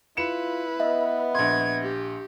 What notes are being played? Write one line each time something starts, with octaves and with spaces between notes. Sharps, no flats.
E4 F4 B4 C#7 E7
B3 D#5 E5
A#1 C6 G#6
G4